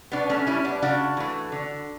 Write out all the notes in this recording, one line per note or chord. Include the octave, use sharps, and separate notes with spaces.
B2 B3 D4
A3 C#4
G3 C#4 E4
B3 D4
C#3 D4 F#4
E3 A3
D3